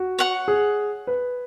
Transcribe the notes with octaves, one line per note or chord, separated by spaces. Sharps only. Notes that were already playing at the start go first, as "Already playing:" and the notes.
Already playing: F#4
C#5 F#5 C#6
G#4
B4